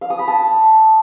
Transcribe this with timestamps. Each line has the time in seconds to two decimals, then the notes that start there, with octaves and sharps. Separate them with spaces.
0.01 F5
0.10 D#6
0.19 B5
0.28 A5